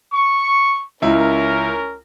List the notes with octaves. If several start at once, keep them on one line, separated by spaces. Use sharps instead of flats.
C#6
C#2 C#4 E4 A#4